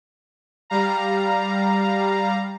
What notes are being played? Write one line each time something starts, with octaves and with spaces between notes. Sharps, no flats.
G3 F5 A#5